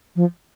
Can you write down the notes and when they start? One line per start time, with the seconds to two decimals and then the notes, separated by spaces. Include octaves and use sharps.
0.16 F3